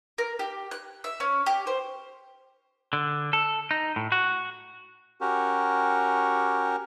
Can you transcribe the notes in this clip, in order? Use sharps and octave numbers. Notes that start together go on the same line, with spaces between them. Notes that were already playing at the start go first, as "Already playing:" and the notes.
A#4
G4
F#6
E5
C#4
G4
C5
D3
A4
D#4
A2
F#4
C#4 F#4 G4 A#4